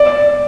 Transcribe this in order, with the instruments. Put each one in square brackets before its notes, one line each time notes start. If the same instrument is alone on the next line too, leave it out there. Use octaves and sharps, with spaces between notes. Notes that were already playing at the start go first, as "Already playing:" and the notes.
Already playing: [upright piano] D5